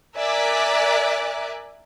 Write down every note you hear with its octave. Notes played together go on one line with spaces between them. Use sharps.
A#4 D5 E5 G#5 D6 F#6